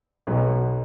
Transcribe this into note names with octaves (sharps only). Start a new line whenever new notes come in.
B1 B2 F#3